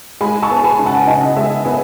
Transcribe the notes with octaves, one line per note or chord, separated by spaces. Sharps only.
G#3 G#5 B5
A5 C#6
B3
G#5 B5
C#3
F#5 A5
C#3 D#5 F#5
G#3 E5 G#5
B3 E5 G#5